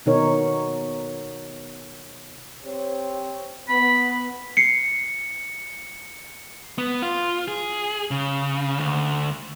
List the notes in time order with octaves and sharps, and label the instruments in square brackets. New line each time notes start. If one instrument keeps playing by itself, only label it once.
[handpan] B2 D#3 B3 D#4 A#4 C#5
[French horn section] C4 G4 C#5
[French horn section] B3 [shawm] B5
[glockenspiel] C7 C#7
[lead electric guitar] B3
F4
G#4
C#3
D2